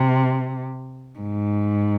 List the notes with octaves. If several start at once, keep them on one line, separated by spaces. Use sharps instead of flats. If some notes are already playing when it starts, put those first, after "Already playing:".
Already playing: C3
G#2